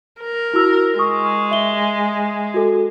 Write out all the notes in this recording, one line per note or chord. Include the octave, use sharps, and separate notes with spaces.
A#4
E4 F#4 E6
G#3 C#6 D#6
E5 G7
F#4 A4